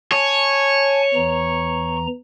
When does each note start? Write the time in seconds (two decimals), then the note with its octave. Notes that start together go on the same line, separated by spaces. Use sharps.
0.12 C#5 G#5 A5
1.14 E2 E3 A#5